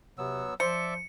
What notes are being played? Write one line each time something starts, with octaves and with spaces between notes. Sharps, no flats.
C3 F#3 B3 E6
F3 C5 D5 E5 C#7